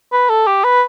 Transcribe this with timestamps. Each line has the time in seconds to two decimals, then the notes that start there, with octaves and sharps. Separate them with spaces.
0.12 B4
0.29 A4
0.47 G4
0.64 B4